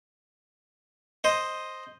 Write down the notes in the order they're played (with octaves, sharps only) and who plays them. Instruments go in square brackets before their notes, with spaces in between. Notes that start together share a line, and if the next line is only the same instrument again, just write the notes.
[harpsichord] C5 D#5